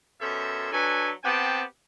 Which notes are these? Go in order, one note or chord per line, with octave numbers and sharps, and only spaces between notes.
F#2 B2 C#4 A4 C5 E5
F#3 D4 A4 B4 G#5
B3 C4 G4 F#5 G5 A5